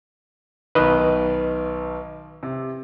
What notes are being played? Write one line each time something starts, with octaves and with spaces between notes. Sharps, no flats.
B1 D#3 B4 D#5
C3